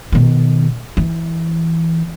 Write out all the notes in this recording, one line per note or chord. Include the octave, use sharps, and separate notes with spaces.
B2 D#3
E3